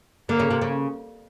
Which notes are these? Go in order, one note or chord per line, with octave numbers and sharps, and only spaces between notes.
D3 A#3
C#3
C3
C#3